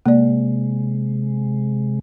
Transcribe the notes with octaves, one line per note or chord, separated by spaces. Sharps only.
C3 G#3 A#3 D5